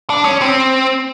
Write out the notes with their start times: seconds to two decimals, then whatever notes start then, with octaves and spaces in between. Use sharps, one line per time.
0.10 D4
0.25 C#4
0.42 C4